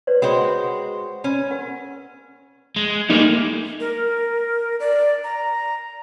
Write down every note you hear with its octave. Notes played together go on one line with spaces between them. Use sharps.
B4 C#5 D5
G#3 F#4 C5 D5 G5
C#4
A#4 F#5
G#3
G3 A3 A#3 D#4 G#4
A#4
D5
A#5